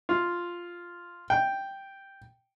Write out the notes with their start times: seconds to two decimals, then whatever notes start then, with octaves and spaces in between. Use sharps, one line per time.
0.09 F4
1.30 G5